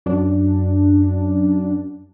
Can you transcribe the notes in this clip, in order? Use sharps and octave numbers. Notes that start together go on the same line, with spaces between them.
F#2 D4